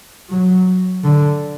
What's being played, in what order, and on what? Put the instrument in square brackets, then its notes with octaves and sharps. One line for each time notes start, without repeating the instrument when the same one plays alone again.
[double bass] F#3
D3